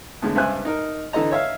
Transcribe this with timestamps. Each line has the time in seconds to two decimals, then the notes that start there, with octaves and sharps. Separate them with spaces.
0.22 E2 A2 D3 G#3
0.35 C#2 G2 C5 E5 G#5 F#6
0.65 D#4 A#4
1.13 D3 E3 A4 D#5 A#5
1.31 C#5 E5 F5